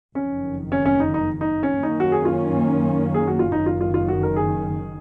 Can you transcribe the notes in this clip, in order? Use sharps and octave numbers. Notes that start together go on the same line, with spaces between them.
F#1 F2 D#3 C#4
C#4
C#4
D#4
D#4
D#4
C#4
F#2 D#3 A#3 C#4 D#4
F#4
G#4
F4
G#4
F#4
F4
F#1 F#2 D#3 D#4
F4
F4
F4
F#4
A#4
G#4